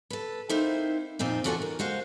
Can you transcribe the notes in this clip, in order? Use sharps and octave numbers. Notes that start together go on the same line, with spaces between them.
A4 B4
A#3 C4 D#4 E4 C5
F2 A#2 C4 D#4
E2 F4 F#4 A4 F5 G#5
A#4
G#3 F#4 C5 F5